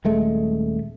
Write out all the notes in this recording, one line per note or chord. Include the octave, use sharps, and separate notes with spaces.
D#1 G#3 A3